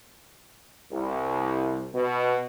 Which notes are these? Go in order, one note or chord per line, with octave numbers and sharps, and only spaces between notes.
C2
B2